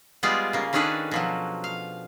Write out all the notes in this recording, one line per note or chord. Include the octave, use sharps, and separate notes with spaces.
G3 G#3 B3 F4 G#4 D5
C#3 A#3
D#3 C#4 D4 G#4 A4 B4
B2 F3 F#3
F5